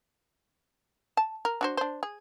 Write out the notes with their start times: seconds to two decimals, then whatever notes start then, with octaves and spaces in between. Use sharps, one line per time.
1.17 A5
1.45 A#4
1.61 D4 F#4 C5
1.77 D4 C5
2.03 G#4